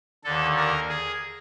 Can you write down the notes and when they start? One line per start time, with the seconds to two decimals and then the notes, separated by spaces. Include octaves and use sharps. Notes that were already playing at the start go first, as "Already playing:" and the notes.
0.24 D#2 D3 A4
0.57 A#4
0.89 G#4